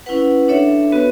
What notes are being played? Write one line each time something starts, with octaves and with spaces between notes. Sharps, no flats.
C#4 E4 B4 F#5
D4 A4 C#5 E5
B3 F#4 B4